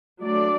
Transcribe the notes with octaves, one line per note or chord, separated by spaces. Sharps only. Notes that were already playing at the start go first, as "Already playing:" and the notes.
F#3 A3 D4 D5